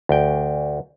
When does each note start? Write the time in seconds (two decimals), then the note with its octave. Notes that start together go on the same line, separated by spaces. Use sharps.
0.09 D2 G5